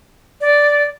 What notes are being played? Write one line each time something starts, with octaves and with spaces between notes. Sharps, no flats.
D5